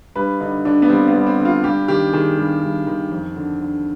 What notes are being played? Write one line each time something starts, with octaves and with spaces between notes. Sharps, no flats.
G2 B4
D3 D#4
D3 D4
B3
G2 C4
B3
G2
C4
D3
F4
G2 G4
D#3 G4
D#3 G#4
G2
G2
D#3
F2
D3
D3